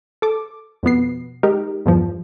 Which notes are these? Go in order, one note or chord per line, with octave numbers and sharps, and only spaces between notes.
A4 D6
F2 B2 B3 C7
G#3 D#4 G4 A#4
E2 G2 F3